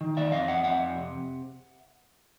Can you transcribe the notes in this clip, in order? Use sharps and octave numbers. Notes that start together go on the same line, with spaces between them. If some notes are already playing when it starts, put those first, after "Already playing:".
D#3
D5 E5
F2 D#5 F5
E5 F#5
F2 E5 F#5
C3